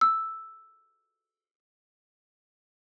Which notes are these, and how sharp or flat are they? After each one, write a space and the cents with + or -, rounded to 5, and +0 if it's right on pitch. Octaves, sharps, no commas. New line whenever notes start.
E6 +0